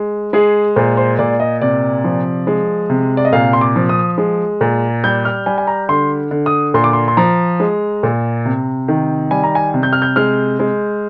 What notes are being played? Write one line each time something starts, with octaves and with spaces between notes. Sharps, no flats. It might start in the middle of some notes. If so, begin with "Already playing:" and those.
Already playing: G#3
G#3 G#4
A#2 C5
C5
A#2 D5
D#5
C3 D5
F3
G#3
C3
D5
D#5
A#2 F5
C6
D6
F3
D#6
G#3
A#2
G3 G6
F6
G3 G#5
G#5
A#5
D3 C6
D3
D#6
A#2 C6
D6
C6
C6
F3 A#5
G#3
A#2
C3
D#3
G3 G#5
A#5
G#5
C3
G6
F6
G6
G#3 F6
G#3